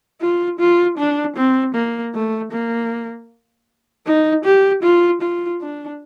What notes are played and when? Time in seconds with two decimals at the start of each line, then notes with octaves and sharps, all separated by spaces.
0.21 F4
0.59 F4
0.98 D4
1.37 C4
1.75 A#3
2.14 A3
2.53 A#3
4.06 D#4
4.45 G4
4.83 F4
5.22 F4
5.61 D4